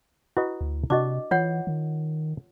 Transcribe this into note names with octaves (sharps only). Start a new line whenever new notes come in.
E4 F#4 B4 D#5
D2
C3 D4 F#4 D#5 D6
E3 F4 C#5 F#5
D#3